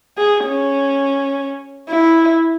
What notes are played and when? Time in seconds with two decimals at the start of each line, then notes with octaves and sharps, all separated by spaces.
0.18 G#4
0.46 C#4
1.89 E4